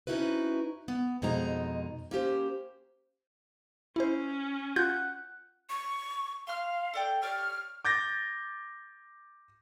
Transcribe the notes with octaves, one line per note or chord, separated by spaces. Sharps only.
F2 C#4 D#4 E4 F#4 B4
B3
F2 B2 G#3 D#4 A#5
A#3 C#4 G4 C5
C#4 E4 C5
F4 F#5 G6
C#6
F5 C6 F6
A4 D5 G5
G4 C#5 D5 F6
D6 G6 A6 A#6